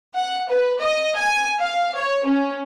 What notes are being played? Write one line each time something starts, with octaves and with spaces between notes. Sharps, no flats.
F#5
B4
D#5
G#5
F5
C#5
C#4